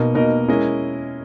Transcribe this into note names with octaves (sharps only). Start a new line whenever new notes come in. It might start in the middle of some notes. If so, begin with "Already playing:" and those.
Already playing: B2 A#3 D#4 A#4 D#5
B2 A#3 D#4 A#4 D#5
G#3 C#4 E4 A#4 D#5